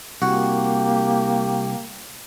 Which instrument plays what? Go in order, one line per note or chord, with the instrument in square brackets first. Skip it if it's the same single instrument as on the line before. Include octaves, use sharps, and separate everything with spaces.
[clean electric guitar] C2 [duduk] A#3 [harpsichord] F#4 [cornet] G4